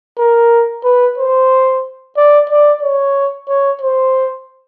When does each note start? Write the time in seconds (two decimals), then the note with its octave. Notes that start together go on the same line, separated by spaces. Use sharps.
0.18 A#4
0.84 B4
1.18 C5
2.17 D5
2.50 D5
2.83 C#5
3.49 C#5
3.82 C5